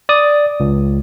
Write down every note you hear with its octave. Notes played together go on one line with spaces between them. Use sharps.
D5 D#6
C#2